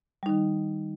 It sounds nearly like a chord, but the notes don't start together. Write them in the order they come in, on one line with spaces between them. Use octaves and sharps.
G3 D#4 D#3